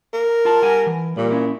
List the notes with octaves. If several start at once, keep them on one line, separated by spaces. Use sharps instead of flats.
A#4
F4 A5
G3 F#5 G#5
E3
A#2 G3
C#4 E4